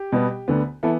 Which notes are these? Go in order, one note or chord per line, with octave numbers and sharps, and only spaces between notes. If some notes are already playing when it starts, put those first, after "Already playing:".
Already playing: G4
B2 G3 B3
D2 D3 B3
E3 B3 E4 A4